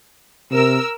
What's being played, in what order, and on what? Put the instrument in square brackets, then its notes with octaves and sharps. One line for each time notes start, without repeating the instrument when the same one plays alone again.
[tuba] C3 [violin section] A#4 E6